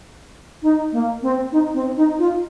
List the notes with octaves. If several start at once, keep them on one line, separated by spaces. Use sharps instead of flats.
D#4
A#3
C4
D#4
C4
D#4
F4